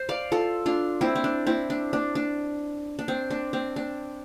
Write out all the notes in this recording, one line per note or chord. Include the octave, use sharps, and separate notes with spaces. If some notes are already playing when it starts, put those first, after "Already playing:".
Already playing: C5
D5 F5
F4 A4
D4 F4
C4 E4
C4
D4
C4 E4
D4
D4
D4
D4
C4
D4
C4
D4